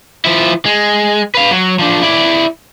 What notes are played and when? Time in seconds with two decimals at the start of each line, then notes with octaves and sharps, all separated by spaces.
0.25 F3 E4
0.66 G#3
1.34 B4 F5
1.51 F#3
1.79 F3 D4
2.03 E4 D5